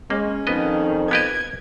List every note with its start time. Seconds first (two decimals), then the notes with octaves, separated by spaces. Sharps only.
0.10 G#3 A#3 C#4
0.47 F2 D#3 B3 D#5
1.11 B3 G4 D#5 G#6